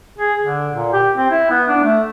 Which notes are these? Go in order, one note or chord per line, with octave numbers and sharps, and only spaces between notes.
G#4
D3
A#2
G4
C4
E4
B3
D4
A3